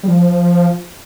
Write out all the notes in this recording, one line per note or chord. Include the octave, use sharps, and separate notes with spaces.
G3
F3